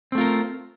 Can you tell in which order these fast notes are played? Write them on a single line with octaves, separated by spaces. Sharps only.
C4 A3 F4 A#4